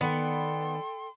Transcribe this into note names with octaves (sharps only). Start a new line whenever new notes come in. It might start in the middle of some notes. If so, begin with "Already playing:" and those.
D#3 B3 A4 D5 F#5 G5 C6